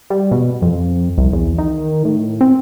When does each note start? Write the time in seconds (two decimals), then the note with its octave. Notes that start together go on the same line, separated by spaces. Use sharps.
0.10 G3
0.31 B2
0.62 F2
1.18 C2
1.33 E2
1.58 D#3
2.05 A2
2.41 C4